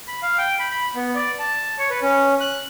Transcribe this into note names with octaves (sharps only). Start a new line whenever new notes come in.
B5
F5
G5
B5
B5
B3
D5
A5
C#5
B4
C#4
F#6